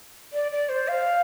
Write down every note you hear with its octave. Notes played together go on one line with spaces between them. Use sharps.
D5
D5
C5
F5